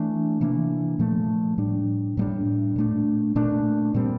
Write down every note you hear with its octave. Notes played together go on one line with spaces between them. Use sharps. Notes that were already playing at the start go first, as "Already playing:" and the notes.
Already playing: E3 A3 D4
C3 E3 A#3 D4
A#2 F3 A3
A2 G3 D4
A2 G3 A#3 D4
A#2 A3 D4
A#2 A3 D4
A#2 G3 C4